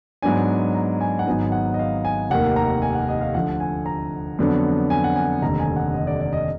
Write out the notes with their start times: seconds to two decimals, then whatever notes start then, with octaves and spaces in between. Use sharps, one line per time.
0.23 G#2 F#3 B3 D4 G#5
0.74 A#5
1.01 G#5
1.19 F#5
1.27 G#1 G#2 F#3 B3 D#4 G#5
1.52 F#5
1.74 D#5
1.79 F5
2.05 G#5
2.30 F1 D#2 D#3 A#3 F#5
2.56 A#5
2.82 G#5
2.95 F#5
3.08 D#5
3.21 F5
3.34 D2 D3 F3 F#5
3.60 G#5
3.86 A#5
4.39 F2 D3 F#3 B3 D4
4.90 G#5
5.04 F#5
5.16 G#5
5.42 F1 D#2 D3 A#5
5.59 G#5
5.76 F#5
5.94 D#5
6.07 D5
6.20 D5
6.33 D#5